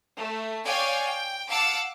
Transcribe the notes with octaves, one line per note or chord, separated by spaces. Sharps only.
A3
C#5 D5 F5 G5 G#5
G5
F5 F#5 A5 D6 E6